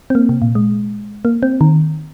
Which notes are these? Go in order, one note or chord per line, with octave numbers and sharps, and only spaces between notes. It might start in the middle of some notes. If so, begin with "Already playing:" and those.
C4
A#3
C3
A#2
G#3
A#3
C4
D#3